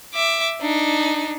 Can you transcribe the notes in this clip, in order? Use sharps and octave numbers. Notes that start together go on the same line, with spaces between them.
E5 D6
D4 D#4